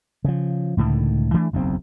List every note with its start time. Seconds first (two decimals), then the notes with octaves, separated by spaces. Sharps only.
0.24 C#3 F3
0.77 C#2 A2 D3 D#3
1.34 E3 A3 D4
1.53 F#1 B1 E2 C4